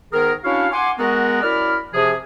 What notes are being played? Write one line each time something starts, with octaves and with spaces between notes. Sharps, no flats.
G#2 D#3 B3 G#4 A#4
C#4 D4 E4 F#4 C#5 F5
F#5 G#5 C6 D6
G#3 B3 F#4 A#4
F#2 E4 A#4 D5 B5 F6
C3 F3 G#4